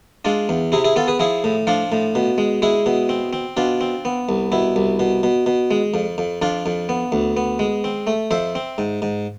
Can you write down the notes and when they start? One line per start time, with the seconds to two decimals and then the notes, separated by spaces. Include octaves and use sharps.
0.25 G#3 D4 F4
0.49 E2
0.72 C3 E4 G#4
0.84 E4 G#4
0.96 B3 F4 A4
1.08 G#4 B4
1.19 F3 E4 G#4
1.44 A2
1.67 F3 D4 F4
1.92 A2
2.15 B2
2.38 G#3
2.62 G#3 E4 G#4
2.86 B2
3.09 C4
3.33 C4
3.57 B2 D4 F4
3.81 C4
4.05 B3
4.29 C2
4.52 B2 E4
4.76 C2
4.99 B2
5.23 B2
5.46 B2
5.71 G#3
5.94 F2
6.18 F2
6.42 F2 D4 F4
6.66 F2
6.89 B3
7.12 D2
7.37 B3
7.59 G#3
7.84 C4
8.07 A3
8.31 F2 C5 E5
8.55 C4
8.78 G#2
9.02 G#2